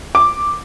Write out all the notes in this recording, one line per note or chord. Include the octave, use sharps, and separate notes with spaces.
D6